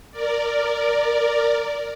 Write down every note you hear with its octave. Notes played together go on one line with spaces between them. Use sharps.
A#4 D5